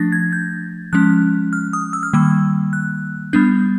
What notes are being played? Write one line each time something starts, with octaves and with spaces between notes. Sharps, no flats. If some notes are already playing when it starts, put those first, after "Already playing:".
Already playing: F3 A3 D4 A6 A#6
G#6
G6
F3 G#3 C#4 F#6
F6
D#6
E6
F6
D#3 G3 A#3 E6
F#6
G3 B3 D4 G6